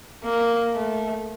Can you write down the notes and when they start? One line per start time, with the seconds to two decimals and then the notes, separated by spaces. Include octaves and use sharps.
0.24 A#3
0.74 A3